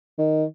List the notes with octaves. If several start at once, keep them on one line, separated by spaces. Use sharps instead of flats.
D#3